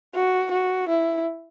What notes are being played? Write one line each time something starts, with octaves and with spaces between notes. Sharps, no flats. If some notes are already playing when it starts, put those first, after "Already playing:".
F#4
F#4
E4